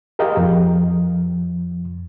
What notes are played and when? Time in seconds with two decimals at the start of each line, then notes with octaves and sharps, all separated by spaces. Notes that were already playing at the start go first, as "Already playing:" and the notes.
0.19 G4 G#4 A#4 D#5 F5 G5
0.37 F2 F3